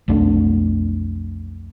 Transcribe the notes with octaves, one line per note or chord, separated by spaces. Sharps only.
B1 F2 A3 D4